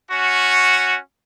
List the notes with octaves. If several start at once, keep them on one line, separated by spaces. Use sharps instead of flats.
C#4 F#4